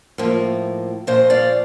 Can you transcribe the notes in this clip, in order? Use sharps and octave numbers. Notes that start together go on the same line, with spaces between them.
A2 F3 A#3
A#2 F3 A3 C5 D#5
D5 F5